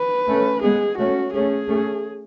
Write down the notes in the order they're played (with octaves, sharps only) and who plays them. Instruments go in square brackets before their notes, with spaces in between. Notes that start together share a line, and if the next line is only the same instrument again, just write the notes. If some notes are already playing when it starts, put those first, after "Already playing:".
Already playing: [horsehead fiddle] B4
[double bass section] A3 C#4
[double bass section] G#3 B3 [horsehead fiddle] G#4
[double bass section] A3 C#4 [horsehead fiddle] F#4
[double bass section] A3 C#4 [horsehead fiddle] G#4
[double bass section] A3 C#4